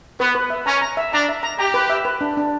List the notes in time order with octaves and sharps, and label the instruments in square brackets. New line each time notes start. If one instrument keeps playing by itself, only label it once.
[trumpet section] B3 [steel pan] B4
[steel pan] B4
E5
[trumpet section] C#4 [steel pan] A#5
[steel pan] A#5
E5
[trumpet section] D4 [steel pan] A#5
[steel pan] E5
A#5
[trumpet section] G4 [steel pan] A#5
[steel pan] B4
E5
B4
D4
D4